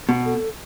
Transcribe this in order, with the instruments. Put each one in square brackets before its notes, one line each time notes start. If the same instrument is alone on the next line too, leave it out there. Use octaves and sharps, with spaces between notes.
[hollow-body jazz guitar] B2
[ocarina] A4